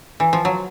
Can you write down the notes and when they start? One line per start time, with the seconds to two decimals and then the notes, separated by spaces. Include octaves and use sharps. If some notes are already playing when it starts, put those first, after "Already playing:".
0.20 E3
0.33 F3
0.45 F#3